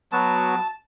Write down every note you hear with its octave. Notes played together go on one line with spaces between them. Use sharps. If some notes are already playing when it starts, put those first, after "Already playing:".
F#3 B3 F#4 A5